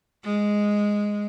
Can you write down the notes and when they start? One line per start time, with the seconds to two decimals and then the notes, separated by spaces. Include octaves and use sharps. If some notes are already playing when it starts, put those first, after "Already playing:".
0.24 G#3